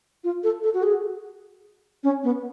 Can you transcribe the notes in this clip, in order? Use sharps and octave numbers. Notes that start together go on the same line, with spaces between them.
F4
A4
A4
F#4
G#4
C#4
B3